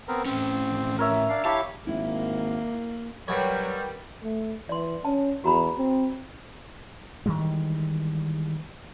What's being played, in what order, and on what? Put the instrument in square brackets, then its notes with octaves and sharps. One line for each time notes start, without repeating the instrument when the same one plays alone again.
[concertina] B3 C4 A#4
[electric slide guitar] A2 C#4 [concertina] C4
[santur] A#4 C#5 E5
[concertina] D4 F5
[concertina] E4 G4 C#5 [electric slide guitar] F5 [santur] A5
[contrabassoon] G#1 [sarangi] A#3 [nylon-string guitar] E4
[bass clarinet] F#3 [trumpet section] G3 [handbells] A#4 B4 [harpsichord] C#5 F#5 G5
[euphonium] A3
[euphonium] E3 [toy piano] D5 C6
[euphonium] C#4 [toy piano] A5
[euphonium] E2 [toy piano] F#4 A#5 B5
[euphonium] C4
[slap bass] D#3 E3 G3 G#3